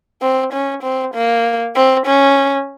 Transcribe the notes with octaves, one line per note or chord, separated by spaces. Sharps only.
C4
C#4
C4
A#3
C4
C#4